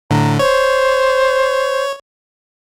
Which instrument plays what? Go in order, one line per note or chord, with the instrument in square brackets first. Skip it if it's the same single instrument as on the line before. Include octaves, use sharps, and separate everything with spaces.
[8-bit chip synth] A2 D3 [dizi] A#5
[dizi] C5 [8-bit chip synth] C#5